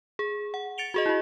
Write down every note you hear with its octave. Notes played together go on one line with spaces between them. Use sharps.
G#4
F#5
A6 C#7 D7 F7 G7
F#4 G#4 D#5
E4 F#4